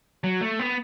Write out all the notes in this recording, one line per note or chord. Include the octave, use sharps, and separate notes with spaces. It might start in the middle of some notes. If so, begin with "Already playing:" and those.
F#3
A3
B3